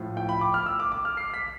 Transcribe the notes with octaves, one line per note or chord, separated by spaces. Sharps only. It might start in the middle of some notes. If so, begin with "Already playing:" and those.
Already playing: A2 F3
G5
B5
D6
F6
E6
D6
D6
F6
C7
B6